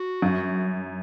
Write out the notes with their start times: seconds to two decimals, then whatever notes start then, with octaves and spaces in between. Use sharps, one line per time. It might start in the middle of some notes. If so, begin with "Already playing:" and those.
Already playing: F#4
0.22 F#2